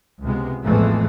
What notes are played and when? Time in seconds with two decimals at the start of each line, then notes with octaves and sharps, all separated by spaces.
0.22 C#2 C3 G#3 B3
0.63 A1 F2 E3 G#3 A3 B3